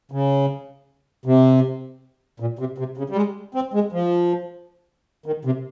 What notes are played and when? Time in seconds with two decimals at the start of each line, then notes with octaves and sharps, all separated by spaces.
0.11 C#3
1.26 C3
2.40 A#2
2.59 C3
2.78 C3
2.97 C#3
3.10 G3
3.16 G#3
3.54 C4
3.74 G#3
3.92 F3
5.26 D#3
5.45 C3